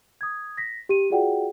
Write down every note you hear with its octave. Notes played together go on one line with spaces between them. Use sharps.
D#6 G#6
A#6 B6
G4 D#7
F4 F#4 G#4 D5 F#5 G5